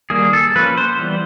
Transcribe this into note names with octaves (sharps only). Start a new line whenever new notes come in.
D#3 G3 A#3 G#4
A4
F3 A#3 C#4 B4
C5
E3 G3 B3